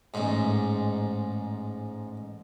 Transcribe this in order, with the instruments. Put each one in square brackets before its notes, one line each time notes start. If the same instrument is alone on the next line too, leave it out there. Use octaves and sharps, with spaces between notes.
[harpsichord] A1 G#2